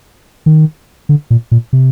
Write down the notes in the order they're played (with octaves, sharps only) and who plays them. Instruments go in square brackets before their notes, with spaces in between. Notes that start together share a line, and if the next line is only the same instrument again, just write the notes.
[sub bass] D#3
D3
A#2
A#2
C3